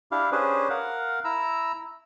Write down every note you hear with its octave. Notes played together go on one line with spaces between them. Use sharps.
D4 E4 G4 F5
C#4 D4 G4 G#4 B4 C5
A#4 F5 F#5
E4 A#5 E6